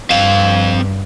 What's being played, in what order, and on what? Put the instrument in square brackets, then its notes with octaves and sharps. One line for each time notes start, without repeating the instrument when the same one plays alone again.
[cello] G2 [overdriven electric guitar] C4 F5